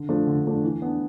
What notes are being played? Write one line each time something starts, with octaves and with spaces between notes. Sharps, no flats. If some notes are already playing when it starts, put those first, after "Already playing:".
Already playing: D3
F3 A3 D4
D3
F3 A3 D4
E3
B3 D4